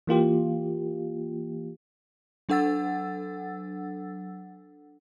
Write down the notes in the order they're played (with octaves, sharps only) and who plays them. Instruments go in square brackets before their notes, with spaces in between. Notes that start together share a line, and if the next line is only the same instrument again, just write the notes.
[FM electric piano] E3 A#3 F4 G4
[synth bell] F#3 D4 A4 F#5 E6 A6